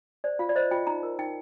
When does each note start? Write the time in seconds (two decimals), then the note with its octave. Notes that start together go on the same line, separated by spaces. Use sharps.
0.24 C5 D5
0.39 F4 F5
0.49 D5
0.56 C5 D#5
0.71 F4 G5
0.87 D#4 A#5
1.03 A#4
1.19 D#4 G5